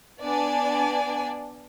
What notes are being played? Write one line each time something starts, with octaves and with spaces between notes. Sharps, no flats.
B3 D4 D5 G#5